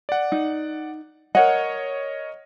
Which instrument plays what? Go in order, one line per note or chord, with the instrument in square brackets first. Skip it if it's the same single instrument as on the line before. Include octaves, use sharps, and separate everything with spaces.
[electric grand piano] D5 F#5
[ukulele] D#4
[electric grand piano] A#4 C#5 D#5 [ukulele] F#5